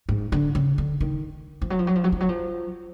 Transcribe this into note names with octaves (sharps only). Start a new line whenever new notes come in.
G#2
D3
C#3
D3
D#3
F3
F#3
F3
F#3
F3
F#3
F3
F#3
F3